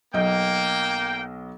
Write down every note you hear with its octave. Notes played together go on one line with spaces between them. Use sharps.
B1 A#3 D#5 G5